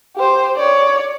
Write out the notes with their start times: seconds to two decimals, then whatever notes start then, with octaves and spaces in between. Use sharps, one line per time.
0.16 G4 C5
0.56 C#5 D5